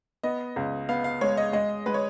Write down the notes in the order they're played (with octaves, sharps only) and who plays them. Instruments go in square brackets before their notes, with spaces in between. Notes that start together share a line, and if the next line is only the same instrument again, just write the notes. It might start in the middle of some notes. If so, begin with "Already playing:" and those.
[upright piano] B3 [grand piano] D#5
[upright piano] C#2
[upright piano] B3 [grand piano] F5
[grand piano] F5
[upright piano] G#3 [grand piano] C#5
[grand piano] D#5
[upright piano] G#3 [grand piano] D#5
[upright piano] G#3 [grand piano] B4
[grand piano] C#5